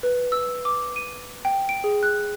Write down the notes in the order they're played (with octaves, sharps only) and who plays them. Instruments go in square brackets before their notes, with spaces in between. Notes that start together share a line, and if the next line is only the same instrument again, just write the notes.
[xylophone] B4
E6
D6
D#7
G5
D7
G#4
F#6